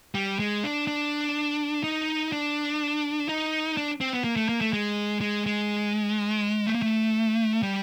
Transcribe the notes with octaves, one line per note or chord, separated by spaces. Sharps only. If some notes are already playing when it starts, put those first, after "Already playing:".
G3
G#3
D4
D4
D#4
D4
D#4
D4
C4
B3
A#3
A3
A#3
A3
G#3
G#3
G#3
A3
A#3
A3
G3